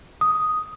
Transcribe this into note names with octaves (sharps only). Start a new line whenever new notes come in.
D#6